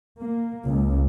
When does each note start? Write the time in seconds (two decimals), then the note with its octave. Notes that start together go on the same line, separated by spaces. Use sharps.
0.19 A#3
0.67 C#2